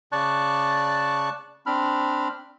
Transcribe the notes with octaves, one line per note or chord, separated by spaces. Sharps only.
C#3 D5 A5 C#6 F#6
C4 D4 B5 F6